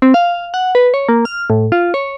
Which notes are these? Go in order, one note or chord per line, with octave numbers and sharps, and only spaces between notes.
C4
F5
F#5
B4
C#5
A#3
F6
A2
F4
C#5